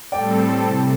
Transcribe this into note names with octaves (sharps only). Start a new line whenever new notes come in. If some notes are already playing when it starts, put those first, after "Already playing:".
A2 G3 C4 A4 D5 G5
C3